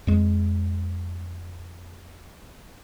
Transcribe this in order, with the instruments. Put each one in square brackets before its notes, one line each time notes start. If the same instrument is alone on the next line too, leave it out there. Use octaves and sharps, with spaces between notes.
[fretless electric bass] F2 G#3